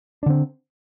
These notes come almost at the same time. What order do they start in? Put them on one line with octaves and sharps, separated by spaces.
D4 D3 C4